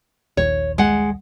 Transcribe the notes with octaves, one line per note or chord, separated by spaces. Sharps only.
D#1 A#1 D#2 C#5
G#3 F#5